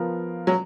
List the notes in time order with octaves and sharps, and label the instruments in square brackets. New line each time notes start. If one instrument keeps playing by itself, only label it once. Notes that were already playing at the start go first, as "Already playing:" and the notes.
Already playing: [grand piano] F3 B3 F4 A#4
[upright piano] F#3